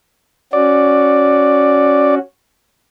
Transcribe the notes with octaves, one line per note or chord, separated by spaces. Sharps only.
C#4 F#4 D5